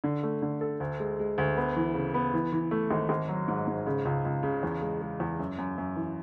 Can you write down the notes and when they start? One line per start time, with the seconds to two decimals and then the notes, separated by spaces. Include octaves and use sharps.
0.04 D3
0.23 A3
0.42 D3
0.61 A4
0.80 D2
0.99 G#3
1.19 G#3
1.38 D2
1.57 B3
1.76 E3
1.94 C#3
2.14 B3
2.34 E3
2.53 E3
2.71 A3
2.91 G#1
3.09 G#1
3.28 F#3
3.48 G#2
3.67 G#2
3.87 C#3
4.05 C#2
4.25 C#2
4.43 C#3
4.63 E2
4.82 G#3
5.01 G#3
5.20 E2
5.39 F#2
5.58 F#2
5.78 F#2
5.96 E3